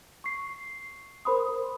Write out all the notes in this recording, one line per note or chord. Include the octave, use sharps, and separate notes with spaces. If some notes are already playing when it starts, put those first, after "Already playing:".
C#6 C7
A#4 C5 B5 C6 D#6